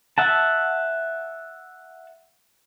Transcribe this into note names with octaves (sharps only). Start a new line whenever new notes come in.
E5 F#5 A5